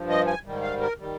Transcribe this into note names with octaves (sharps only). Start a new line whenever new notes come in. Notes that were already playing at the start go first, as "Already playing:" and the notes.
Already playing: G2 F3
D#5
G#5
G#2 D#3 G3
F5
A#4
D#3 G3